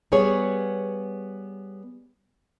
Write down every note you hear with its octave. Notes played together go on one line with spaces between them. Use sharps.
G3 B3 G#4 C#5